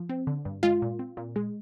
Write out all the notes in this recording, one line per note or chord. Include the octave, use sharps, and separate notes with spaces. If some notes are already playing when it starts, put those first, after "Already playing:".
Already playing: F3
C4
D3
G2
G#3 F4
A#2
C4
A#2
G#3